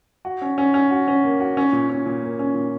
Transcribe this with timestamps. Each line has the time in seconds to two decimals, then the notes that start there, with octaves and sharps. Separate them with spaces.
0.25 F#4
0.42 C#4
0.58 C#4
0.74 C#4
0.91 F#4
1.08 C#4
1.24 A#3
1.40 F#4
1.57 C#4
1.72 A#2
1.90 C#4
2.06 A#2
2.22 A#3
2.39 C#4
2.55 A#2